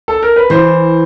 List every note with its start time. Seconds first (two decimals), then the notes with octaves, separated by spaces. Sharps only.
0.08 A4
0.23 A#4
0.36 B4
0.50 E3 C5